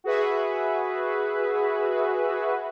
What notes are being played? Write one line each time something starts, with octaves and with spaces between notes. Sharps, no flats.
F#4 G#4 B4 E5